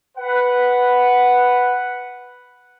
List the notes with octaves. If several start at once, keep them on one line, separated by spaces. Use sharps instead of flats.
B4 F#5